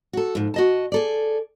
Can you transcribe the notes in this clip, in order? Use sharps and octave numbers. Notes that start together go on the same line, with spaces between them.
F#4 A4
G#2 F3
F#4 D#5 A5
G#4 A4 D5